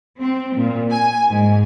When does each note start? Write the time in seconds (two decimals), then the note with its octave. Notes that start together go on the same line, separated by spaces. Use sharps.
0.20 C4
0.57 A#2
0.91 G#5
1.29 G#2